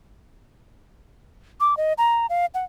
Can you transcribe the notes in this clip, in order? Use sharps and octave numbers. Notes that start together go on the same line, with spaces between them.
D6
D#5
A#5
F5
F#5